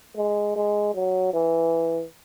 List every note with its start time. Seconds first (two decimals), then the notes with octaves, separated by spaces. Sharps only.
0.16 G#3
0.56 G#3
0.95 F#3
1.33 E3